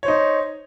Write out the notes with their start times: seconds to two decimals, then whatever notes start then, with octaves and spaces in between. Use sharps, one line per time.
0.03 C#5
0.05 C5
0.08 D#4